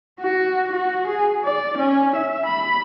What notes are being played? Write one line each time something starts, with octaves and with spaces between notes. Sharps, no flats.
F#4
F#4
G#4
D5
C#4
E5
B5